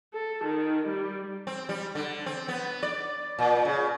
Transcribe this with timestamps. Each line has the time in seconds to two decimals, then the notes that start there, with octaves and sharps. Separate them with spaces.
0.14 A4
0.44 D#3
0.88 G3
1.47 C4
1.69 G3
1.95 D3
2.26 C4
2.48 B3
2.83 D5
3.39 A#2
3.65 C#3